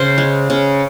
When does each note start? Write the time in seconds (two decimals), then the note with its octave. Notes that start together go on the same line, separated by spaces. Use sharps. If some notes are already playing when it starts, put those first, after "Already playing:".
Already playing: C#3 C5
0.18 G#3
0.50 C#3